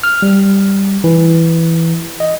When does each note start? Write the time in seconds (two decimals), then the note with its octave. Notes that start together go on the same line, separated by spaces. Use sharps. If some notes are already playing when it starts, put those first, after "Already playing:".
0.03 F6
0.22 G3
1.04 E3
2.20 D#5